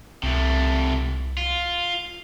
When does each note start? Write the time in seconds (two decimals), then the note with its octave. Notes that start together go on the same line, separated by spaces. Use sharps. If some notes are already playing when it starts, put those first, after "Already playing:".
0.23 C2 C3 A3
1.37 F4